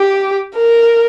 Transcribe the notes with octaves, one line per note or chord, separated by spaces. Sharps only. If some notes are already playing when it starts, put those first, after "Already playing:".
Already playing: G4
A#4